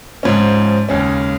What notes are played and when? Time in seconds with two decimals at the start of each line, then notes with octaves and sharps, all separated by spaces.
0.23 G#2 F3 C#4
0.89 D#2 C#3 G#3 C#4